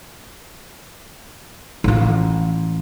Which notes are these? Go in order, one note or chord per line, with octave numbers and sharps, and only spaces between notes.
A1 F4